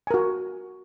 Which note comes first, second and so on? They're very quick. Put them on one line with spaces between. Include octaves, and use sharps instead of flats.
G#5 A#4 F#4